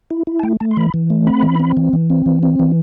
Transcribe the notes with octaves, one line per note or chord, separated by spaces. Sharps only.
E4
E4
A5
A3 G5
A3 A5
C6
E3 B5
E3
A3
C4 B5
E3
C4
E3
E3
C4
E3
C4
E3